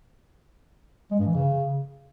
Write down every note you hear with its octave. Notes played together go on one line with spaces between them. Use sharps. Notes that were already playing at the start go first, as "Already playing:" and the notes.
G#3
G2
E3
C#3